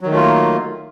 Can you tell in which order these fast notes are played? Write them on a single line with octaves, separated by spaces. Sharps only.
F#3 D#3 A3 F4 A#3